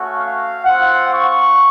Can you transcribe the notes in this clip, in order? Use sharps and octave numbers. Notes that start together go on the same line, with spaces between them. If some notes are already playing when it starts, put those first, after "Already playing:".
Already playing: A3 C#4 F#4
F5
C4 F4 F#5
C#6